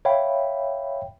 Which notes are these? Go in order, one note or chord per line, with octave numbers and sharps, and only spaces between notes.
C#5 E5 F5 G5 B5